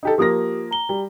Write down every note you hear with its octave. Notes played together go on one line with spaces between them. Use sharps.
D#4 G4 A4
F3 A#3 G4 D#6 A#6
A#5 G7
G3